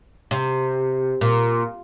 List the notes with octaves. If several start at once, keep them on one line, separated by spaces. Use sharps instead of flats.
C3
A#2